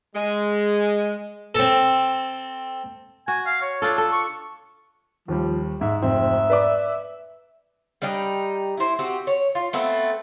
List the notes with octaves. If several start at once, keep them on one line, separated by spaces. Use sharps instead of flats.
G#3
C4 A4
F#4 G#5
F5
C#5
D4 F4 A4
A4
C#6
D#2 F3 G3
G#2 E5
F1 C4 E5
B4 D5 D6
G3 D4 D#4 G5
E4 C5
C4 F#4 G4
C#5
F4
A3 B3 C4